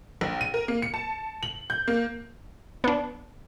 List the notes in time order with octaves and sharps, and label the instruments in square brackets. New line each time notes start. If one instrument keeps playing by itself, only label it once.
[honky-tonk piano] A#1
D#7
A#4
A#3
C#7
A5
F#7
G6
A#3
[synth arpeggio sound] B3 D4